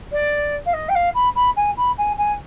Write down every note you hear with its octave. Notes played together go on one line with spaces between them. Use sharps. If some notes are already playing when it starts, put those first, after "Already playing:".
D5
F5
D#5
G5
F5
B5
B5
G#5
B5
G#5
G#5